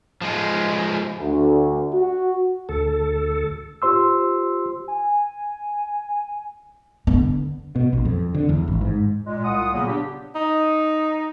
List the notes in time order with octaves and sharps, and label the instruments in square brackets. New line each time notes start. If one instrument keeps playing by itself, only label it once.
[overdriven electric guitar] F3 G#3
[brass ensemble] D2
F#4
[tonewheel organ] D2 A4
[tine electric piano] F4 G4 C5 C6 E6
[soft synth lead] G#5
[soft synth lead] D3 [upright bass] B3
[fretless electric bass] B2
A#1
F2
D3
E2
G#1
G#2
[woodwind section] A#2 G#3
C2 F4 F#5 D#6
A#2 C#3 F#3 A#3 B3
B3 D4 G4
[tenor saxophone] D#4